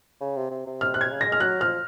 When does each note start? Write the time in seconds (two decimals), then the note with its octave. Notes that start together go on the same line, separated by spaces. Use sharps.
0.21 C#3
0.36 C3
0.51 C3
0.67 C3
0.81 C3 F6
0.94 C3 F#6
1.01 G#6
1.11 C#3
1.21 A#6
1.26 G#3
1.32 F6
1.40 F#3 F#6
1.61 F3 F6